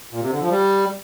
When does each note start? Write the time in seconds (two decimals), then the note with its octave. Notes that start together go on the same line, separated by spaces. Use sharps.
0.11 A#2
0.21 C3
0.30 D3
0.40 F3
0.50 G3